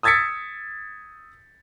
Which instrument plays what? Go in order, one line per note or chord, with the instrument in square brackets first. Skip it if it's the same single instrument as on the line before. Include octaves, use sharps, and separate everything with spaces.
[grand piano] D#6 E6 G#6 A6 B6 C#7